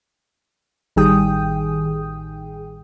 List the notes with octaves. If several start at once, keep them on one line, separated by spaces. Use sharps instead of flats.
A1 D#3 G3 G#4 G5 D#6